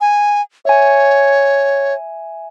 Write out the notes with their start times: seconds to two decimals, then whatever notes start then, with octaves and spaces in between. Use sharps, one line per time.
0.01 G#5
0.65 C#5 E5 G#5